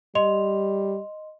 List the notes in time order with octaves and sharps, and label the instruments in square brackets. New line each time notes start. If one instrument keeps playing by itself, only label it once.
[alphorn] G3 [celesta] D#5 C6 F7